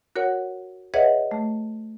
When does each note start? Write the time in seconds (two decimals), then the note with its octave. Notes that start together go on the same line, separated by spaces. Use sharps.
0.16 F#4 A#4 C#5 F#5
0.94 G#4 B4 C#5 D#5 E5 F#5
1.31 A3